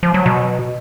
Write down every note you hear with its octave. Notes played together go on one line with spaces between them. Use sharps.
F3
F#3
B2